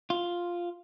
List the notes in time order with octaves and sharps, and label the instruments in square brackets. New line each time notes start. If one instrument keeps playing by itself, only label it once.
[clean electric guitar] F4